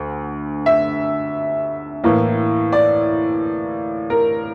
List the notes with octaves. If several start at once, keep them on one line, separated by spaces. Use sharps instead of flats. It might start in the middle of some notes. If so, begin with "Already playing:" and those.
Already playing: D2 D3
E5
A2 E3 A#3
D5
A#4